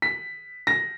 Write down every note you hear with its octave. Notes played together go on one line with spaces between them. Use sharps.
B6
A#6